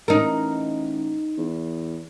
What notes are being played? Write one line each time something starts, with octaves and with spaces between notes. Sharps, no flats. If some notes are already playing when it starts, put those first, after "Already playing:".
A1 D#4 A#4
E2